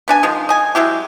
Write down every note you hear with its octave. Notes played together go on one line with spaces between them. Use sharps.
B3 D4 G#5
D#3 F3 G#3
D#5 G#5
F#3 G#3 E4 G4